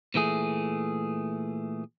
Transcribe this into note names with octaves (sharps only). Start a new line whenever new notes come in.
A#2 E3 A3 G#4